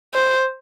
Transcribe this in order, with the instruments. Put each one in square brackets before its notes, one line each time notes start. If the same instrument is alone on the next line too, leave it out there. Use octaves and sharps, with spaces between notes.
[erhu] C5